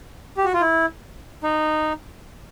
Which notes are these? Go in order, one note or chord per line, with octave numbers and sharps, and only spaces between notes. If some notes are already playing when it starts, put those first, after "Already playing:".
G4
F#4
F4
E4
D#4